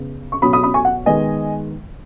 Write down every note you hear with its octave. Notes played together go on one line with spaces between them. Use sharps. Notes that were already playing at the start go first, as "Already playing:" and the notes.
Already playing: C#3 B3
C#6
B2 F#3 C#4 B5 D#6
B5 D#6
B5 D#6
G#5 C#6
F#5
D#3 G#3 B3 D#5 G#5